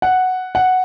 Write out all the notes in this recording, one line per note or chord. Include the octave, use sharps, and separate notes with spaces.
F#5
F#5